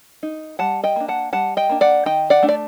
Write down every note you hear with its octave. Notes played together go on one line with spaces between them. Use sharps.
D#4
G3 F#5 A5
D#5 G5
A#3 D4
F#5 A5
G3 F#5 A5
D#5 G5
A#3 D4
D5 F#5
D#3 D#5 G5
D5 F#5
A3 D4
D5